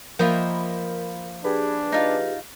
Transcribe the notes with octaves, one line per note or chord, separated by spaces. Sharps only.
F3 A#3 F4 A#4 D#5 E5 G5 B5
D4 G4 G#4 B4
D#4 F4 F5